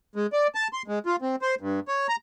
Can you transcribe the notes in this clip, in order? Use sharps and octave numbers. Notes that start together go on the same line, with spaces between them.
G#3
D5
A5
C6
G#3
F4
C4
C5
G2
C#5
A#5